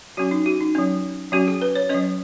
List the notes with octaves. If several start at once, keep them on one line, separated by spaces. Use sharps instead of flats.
F#3 C#4 F#4
D#4
F#4
D#4
F#3 C#4
F#3 C#4 F#4
G#4
B4
C#5
F#3 C#4 D#5